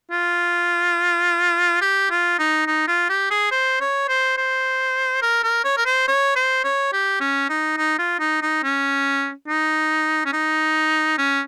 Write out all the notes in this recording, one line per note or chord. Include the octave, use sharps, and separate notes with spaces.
F4
G4
F4
D#4
D#4
F4
G4
G#4
C5
C#5
C5
C5
A#4
A#4
C#5
A#4
C5
C#5
C5
C#5
G4
C#4
D#4
D#4
F4
D#4
D#4
C#4
D#4
C#4
D#4
C#4